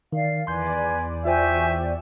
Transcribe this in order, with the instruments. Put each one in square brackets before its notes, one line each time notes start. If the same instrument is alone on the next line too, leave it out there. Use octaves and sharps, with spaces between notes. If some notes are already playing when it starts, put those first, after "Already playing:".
[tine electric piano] D#3 [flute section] D5 F5
[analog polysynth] E2 D5 [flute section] B4 [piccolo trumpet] G#5 [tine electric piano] C6 G6
[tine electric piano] F4 C5 G5 [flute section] F#4 G#5 G6 [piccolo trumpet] E5